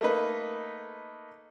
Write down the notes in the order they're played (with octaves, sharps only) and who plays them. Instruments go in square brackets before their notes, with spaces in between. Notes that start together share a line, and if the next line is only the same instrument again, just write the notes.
[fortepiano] A3 A#3 D#4 B4